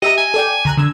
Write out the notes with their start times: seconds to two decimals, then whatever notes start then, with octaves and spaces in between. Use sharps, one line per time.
0.02 G4 D#5 E5 A#5
0.17 G#5
0.34 A4 D5 G5
0.65 D2 A#5 F#6
0.77 D3 E6 G#6